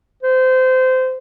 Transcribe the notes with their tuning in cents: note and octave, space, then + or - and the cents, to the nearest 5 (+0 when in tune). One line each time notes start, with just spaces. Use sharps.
C5 -25